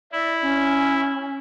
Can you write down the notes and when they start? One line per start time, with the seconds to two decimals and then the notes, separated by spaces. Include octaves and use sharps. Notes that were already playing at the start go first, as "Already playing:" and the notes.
0.12 E4 D5
0.42 C#4